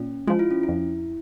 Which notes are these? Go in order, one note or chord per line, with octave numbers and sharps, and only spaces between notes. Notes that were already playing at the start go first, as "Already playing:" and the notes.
Already playing: A#2 C#4
F3 G#3 F4
E4
C#4
F2 E4